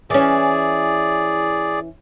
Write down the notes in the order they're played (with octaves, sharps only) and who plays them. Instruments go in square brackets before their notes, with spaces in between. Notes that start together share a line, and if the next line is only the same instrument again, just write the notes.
[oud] E3 C#4 [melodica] G#4 D5